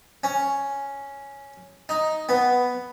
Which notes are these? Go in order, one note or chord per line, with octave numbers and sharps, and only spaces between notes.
C#4
D#4
B3